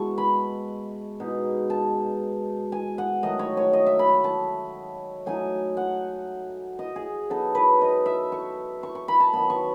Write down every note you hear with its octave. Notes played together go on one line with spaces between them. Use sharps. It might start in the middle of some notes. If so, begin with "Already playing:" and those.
Already playing: B2 G#3 B3 E4 A5 C#6
B5
B2 G#3 D#4
A5
G#5
F#5
D#3 F#3 A3 D#5
C#5
C#5
D#5
E5
B5
A5
F#3 A3 D#4 G#5
F#5
D#5
G#4
F#3 B3 D#4 A4
B4
D#5
E5
C#6
C#6
C#6
B5
A5
D#3 F#3 B3 B5
C#6